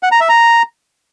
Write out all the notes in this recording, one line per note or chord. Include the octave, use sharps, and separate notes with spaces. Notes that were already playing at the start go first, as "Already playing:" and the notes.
F#5
A#5
E5
A#5